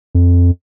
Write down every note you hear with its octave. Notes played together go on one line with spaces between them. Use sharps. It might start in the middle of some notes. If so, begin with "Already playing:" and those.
F2